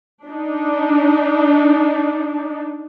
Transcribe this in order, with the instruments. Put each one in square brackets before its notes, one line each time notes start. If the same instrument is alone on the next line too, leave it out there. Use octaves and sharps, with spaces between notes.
[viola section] D4 D#4